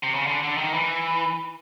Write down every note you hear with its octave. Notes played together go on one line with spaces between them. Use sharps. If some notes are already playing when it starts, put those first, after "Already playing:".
C3
C#3
D3
D3
D#3
E3